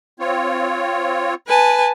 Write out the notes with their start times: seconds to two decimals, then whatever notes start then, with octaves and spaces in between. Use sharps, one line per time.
0.20 C4 F4 C#5
1.46 B4 G#5 A5